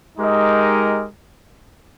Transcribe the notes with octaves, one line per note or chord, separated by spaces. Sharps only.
G#3 D#4 G4 A#4 D#5